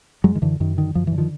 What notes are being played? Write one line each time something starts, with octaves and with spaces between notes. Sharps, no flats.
F#2 F#3 G#3
D#3
F#2 D3 E3
F#2 D#3
D3 D#3
F#2 F3
E3
D3
D#3 F3